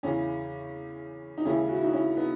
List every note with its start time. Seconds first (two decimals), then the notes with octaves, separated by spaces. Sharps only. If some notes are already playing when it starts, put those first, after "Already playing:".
0.03 E2 C#3 E3 C#4
1.38 D#4
1.45 D#2 C#3 E3 G#3 C#4 E4
1.69 F#4
1.76 E4
1.83 D#4 F#4
1.93 C#4 E4
2.17 B3 D#4